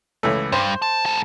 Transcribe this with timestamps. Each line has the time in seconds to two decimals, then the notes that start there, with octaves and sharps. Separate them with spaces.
0.23 C#2 E3 A3
0.52 G2 C5
0.82 A5
1.06 G#2 A4